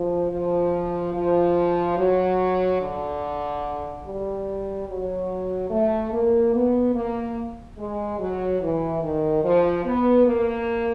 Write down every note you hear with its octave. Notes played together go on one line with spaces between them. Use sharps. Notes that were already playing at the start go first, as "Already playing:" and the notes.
Already playing: F3
F3
F3
F#3
D3
G3
F#3
A3
A#3
B3
A#3
G#3
F#3
E3
D#3
F3
B3
A#3